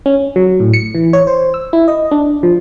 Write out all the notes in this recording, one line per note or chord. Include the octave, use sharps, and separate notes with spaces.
C#4
F#3
A2
C#7
E3
C#5
C5
E6
E4
D#5
D4
F3